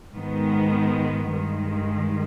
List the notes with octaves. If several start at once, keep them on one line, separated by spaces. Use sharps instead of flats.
G#2 D#3 G#3 B3
G2 D#3 G#3